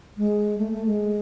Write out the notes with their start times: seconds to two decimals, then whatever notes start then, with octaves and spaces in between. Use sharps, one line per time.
0.17 G#3
0.58 A3
0.72 A3
0.86 G#3